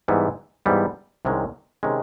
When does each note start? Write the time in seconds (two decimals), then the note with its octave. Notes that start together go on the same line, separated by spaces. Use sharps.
0.08 G#2 E3 G3 B3
0.66 G#2 E3 G3 B3
1.25 C2 C3 D#3 G#3 C#4
1.83 C3 D#3 G#3 C#4